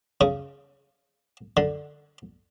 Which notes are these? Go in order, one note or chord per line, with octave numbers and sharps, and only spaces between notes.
C#3
D3